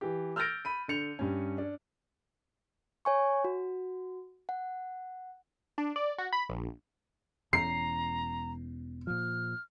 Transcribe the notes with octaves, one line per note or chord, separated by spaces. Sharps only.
E3 G4
E6 F6 G6 A6 A#6 D7
B5 D#7
D3 G6 C#7 F7
G2 C#4
D4
C#5 G#5 C#6
F#4
F#5
D4
D5
F#4
B5
A#1
E1 E2 C#4 A#5 C7
A#2 F3 F6